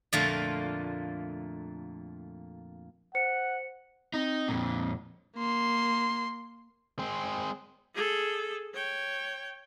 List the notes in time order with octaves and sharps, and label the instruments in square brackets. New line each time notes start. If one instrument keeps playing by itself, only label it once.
[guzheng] F2 A#2 D3 A3 A#3 F4
[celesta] C5 C#7 [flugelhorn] F#5
[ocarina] C4 [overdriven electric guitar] D#4
[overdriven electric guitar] F2 A#2
[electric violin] A#3 C6
[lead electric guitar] G#3 C4
[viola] G#4 A4
C#5 G5